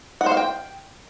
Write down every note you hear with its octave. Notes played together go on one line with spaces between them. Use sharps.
F#5
C5
F5
G5